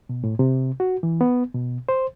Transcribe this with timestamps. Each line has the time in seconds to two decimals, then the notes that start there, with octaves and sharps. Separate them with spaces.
0.09 B2
0.24 A2
0.39 C3
0.80 F#4
1.03 E3
1.21 B3
1.54 B2
1.89 C5